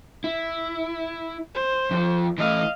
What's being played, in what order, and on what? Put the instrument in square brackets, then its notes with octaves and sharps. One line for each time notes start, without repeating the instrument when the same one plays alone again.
[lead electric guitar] E4
[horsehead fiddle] C5
[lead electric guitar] F2 F3
[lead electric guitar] E3 A3 [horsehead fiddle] D#5 F5